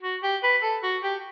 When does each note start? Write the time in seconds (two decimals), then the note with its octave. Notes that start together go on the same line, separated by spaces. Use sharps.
0.02 F#4
0.23 G4
0.43 B4
0.62 A4
0.83 F#4
1.03 G4